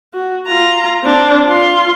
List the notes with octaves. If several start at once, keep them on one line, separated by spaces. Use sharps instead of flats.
F#4
F4 A#5
C4 D4
F4 C6